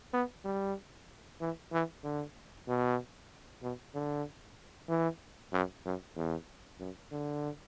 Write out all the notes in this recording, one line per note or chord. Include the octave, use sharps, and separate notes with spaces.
B3
G3
E3
E3
D3
B2
B2
D3
E3
F#2
F#2
E2
F#2
D3